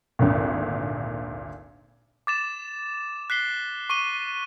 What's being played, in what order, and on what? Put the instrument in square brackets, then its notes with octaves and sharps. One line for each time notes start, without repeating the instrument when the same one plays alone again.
[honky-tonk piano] G#1 D2 A#2
[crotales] D6 A6 E7
F#6 B6 C7 G7
C#6 D6 D#7 G7